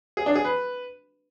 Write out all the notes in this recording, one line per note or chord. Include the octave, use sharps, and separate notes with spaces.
G#4
D4
G#4
B4